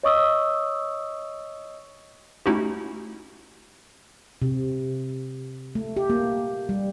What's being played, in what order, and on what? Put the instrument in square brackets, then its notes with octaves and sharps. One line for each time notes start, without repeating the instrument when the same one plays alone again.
[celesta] C#5 D#5 C#6 D#6 E6
[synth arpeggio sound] A3 C#4 D#4 E4 F#4 G4
[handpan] C3
A3
G4
A#3
G3